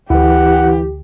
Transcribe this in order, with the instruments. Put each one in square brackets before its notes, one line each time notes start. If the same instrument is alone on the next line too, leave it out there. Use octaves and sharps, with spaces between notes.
[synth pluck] D2 [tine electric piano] E3 E4 [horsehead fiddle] G4 [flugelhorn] F#5